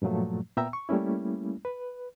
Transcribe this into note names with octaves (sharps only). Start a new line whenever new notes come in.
G2 A#2 F3 F#3 A3
A#2 B3 E5 G5 A#5 E6
C#6
G3 A3 A#3 C#4 E4
B4